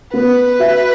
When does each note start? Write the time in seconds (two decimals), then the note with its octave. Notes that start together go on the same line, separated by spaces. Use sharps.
0.14 B3 B4
0.59 F#4 E5